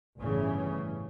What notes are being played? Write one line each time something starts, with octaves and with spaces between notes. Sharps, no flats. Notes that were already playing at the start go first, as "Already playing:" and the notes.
G1 A2 C#3 E3 C#4